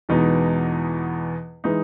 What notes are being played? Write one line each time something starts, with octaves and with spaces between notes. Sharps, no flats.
E2 B2 G#3 B3 D#4
E3 G#3 D#4